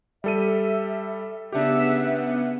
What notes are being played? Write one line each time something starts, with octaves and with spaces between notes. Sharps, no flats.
G3 A4 E5 D#7
C#3 B3 D4 G4 E5 F#5